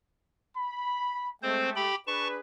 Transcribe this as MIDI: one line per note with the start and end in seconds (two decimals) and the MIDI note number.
0.56 1.30 83
1.43 1.89 56
1.43 1.89 57
1.43 1.70 60
1.43 1.70 72
1.76 1.95 67
1.76 1.95 79
1.76 1.95 83
2.07 2.40 62
2.07 2.40 68
2.07 2.40 71
2.07 2.28 81
2.07 2.28 85